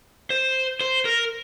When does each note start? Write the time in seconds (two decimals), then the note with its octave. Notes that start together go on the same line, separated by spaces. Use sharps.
0.30 C5
0.81 C5
1.05 A#4